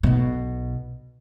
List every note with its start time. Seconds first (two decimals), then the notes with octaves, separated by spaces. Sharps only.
0.03 B1 B2